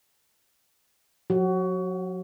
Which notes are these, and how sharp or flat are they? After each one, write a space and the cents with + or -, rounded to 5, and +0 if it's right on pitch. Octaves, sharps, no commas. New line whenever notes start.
F#3 -35 F#4 +25